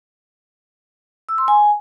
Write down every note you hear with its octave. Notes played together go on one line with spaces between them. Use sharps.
E6
C6
G#5